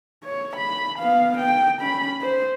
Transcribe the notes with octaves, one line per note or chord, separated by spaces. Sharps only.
C#5
B5
B3 F5
G5
C#4 B5
C5